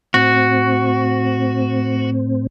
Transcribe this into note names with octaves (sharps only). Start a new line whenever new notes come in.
A2 C4 F#4